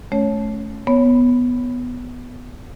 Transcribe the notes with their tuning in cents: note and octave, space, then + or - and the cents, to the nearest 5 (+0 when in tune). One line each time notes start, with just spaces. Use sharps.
A3 -30 C#4 +0 C#5 +0
B3 +0 C#5 +0